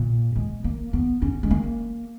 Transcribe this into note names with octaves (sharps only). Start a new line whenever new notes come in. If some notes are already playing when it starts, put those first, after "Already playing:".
Already playing: A#2
G#3
A#3
B3
C#4
G#3
A#3